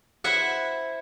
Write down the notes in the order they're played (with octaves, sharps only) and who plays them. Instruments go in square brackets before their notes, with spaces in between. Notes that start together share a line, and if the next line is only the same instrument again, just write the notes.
[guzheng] E4 C5 E5 F#5